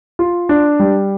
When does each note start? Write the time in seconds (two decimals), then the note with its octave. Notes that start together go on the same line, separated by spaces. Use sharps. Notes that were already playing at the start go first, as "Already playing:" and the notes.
0.19 F4
0.49 D4
0.79 G3